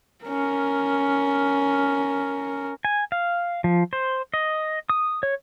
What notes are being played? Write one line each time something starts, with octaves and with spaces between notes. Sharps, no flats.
C#4 A#4
G#5
F5
F3
C5
D#5
D#6
C#5